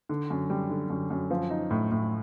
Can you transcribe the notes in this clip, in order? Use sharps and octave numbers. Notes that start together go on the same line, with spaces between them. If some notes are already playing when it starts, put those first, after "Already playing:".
D3
F#2
G3
D3
F#2
F#2
F3
D#4
A2
A2